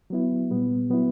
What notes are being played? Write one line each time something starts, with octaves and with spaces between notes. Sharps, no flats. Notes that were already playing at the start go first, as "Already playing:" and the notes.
F#3 B3 E4
A#2 G3 B3
F#3 B3 E4